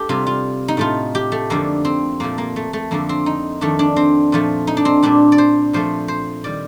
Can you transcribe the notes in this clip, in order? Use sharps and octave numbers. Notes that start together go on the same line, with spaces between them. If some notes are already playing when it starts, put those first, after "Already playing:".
Already playing: A3 G4 A4
C3 G3 F4
F4
D#4
A2 A3 F4
G4
A3
F2 D3 F3 A3 A#3
C4
A#2 F3 A3 A#3
A#3
A3
A3
F2 D3 A3 A#3
C4
D#4
F2 D#3 A3 D4
D4
C4
A#2 F3 A3
D#4
D4
C4
A#2 G3 D4
D5
C5
A#2 F3 A3 C5
C5
D#3 G3 D5